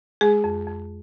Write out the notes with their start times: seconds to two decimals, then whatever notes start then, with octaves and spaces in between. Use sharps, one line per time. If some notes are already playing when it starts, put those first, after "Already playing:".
0.21 G#3 G#4
0.44 F2
0.67 F2